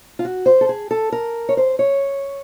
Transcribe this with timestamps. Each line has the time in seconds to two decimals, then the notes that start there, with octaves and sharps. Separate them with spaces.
0.19 F4
0.25 F#4
0.46 C5
0.61 A4
0.69 G#4
0.91 A4
1.12 A#4
1.49 C#5
1.57 C5
1.79 C#5